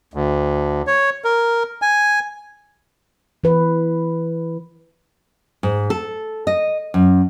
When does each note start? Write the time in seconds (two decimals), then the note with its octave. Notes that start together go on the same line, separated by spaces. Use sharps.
0.14 D2
0.87 C#5
1.24 A#4
1.82 G#5
3.44 E3 B4
5.63 G#2
5.90 A4
6.47 D#5
6.94 F#2